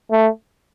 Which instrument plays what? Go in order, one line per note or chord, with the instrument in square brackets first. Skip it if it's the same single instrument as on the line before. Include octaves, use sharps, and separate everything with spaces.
[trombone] A3